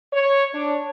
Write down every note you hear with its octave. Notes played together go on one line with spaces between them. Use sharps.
C#5
D4